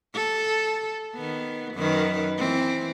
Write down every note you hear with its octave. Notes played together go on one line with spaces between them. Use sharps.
A4
D#3 B3
F#2 D#3 B4
E3 C4